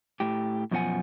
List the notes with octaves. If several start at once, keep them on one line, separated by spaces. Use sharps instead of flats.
A2 G4
F#2 B2 F3 C#4 F#5 G#5